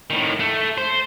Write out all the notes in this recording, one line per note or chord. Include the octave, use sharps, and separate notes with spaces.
A2 D#3
A3
C5